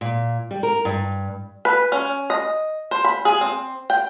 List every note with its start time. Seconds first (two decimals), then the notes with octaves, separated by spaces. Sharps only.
0.01 A#2
0.51 G3
0.63 A#4
0.85 G2
1.65 B4
1.92 C#4
2.30 D#5
2.91 C5
3.04 B5
3.25 G#4
3.41 C4
3.90 G5